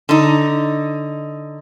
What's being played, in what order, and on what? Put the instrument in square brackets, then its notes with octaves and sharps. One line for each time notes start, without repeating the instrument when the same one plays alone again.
[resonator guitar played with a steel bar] D3 D#4